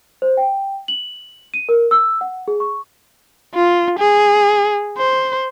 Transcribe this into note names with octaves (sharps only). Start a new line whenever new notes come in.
C5
G5
F#7
D#7
A#4
E6
F#5
G#4
C#6
F4
G#4
C5